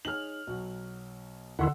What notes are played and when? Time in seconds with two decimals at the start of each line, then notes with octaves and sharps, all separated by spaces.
0.05 D#4 G#4 C#5 F6 F#7
0.47 B1 F#3 F#4
1.59 D#2 D3 D#3 E4 F#5 C6 E6